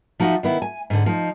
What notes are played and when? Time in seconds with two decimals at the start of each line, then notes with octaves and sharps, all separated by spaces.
0.20 F3 D#4 F#4 E5
0.43 D#3 B3 E4
0.62 G#5
0.90 G#2 D3
1.06 F3 D#4